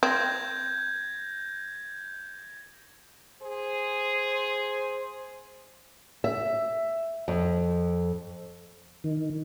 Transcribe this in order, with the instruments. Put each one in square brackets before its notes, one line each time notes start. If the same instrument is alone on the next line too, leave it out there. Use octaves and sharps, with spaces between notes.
[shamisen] C4 [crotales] G6 G#6 A#6
[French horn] G#4 [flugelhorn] C5
[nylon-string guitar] E5
F2
[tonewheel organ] D#3